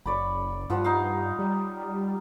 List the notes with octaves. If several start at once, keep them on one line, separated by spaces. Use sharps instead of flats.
F#1 C#5 D5 B5
G2 F3 F4 F#5
D#4 F5
G3